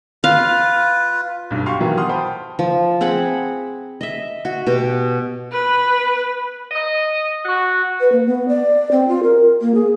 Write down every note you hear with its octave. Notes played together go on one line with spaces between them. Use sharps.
F4 B4 F5
B1 G2
F#4 G4 F5 C6 C#6
B2 D#3 E3 F#3 G3
F#5 C6 D#6 F6
C5 G5 A5 B5 C6
F3
C4 G#4 F#5 B5
D#5 E5
F#4
B2 G4
B4
D#5
F#4
B4
A#3
B3
D5
C4
F4
A#4
A#3
G#4